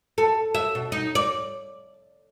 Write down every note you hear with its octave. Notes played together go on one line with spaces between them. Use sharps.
A4
E5
B2
D#4
D5